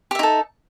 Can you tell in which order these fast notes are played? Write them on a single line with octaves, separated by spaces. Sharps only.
G4 E5 D#4 A4